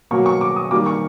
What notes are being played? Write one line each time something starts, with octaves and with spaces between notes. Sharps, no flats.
B2 F#3 A#3 C#6
C#6
D6
D#6
D#3 G3 A#3 D6
C#6